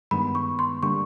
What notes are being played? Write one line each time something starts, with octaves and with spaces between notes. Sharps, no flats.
G2 D#3 G#3 B3 B5
C#6
C6
D3 G3 A#3 D4 C#6